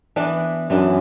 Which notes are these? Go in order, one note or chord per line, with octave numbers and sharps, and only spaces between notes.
E3 B3 D4
F#2 E3 B3 D4